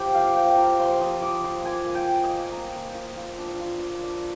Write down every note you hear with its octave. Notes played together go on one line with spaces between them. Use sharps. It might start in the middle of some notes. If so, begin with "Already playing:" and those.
Already playing: F3 G4
A#3 F5
F3 G5
F4 A#5
F3 C6
F3 D#6
F4 D6
F4 C6
A#3 G#5
A#3
G5
A#3
D#5
A#3
A#3 A#5
A#3
F4
F4
D4
F4
D4
D4